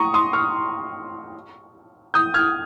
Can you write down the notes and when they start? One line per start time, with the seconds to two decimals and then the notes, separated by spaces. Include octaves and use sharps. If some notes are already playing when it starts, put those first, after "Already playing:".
Already playing: A#5 C#6 D#6
0.14 C6 D#6
0.33 C#6 F6
2.14 D#6 G6
2.34 F6 G#6